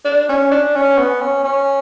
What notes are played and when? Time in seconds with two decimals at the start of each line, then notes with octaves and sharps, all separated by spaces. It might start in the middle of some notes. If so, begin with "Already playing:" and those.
0.05 D4
0.29 C#4
0.51 D4
0.75 C#4
0.97 B3
1.21 C#4
1.44 C#4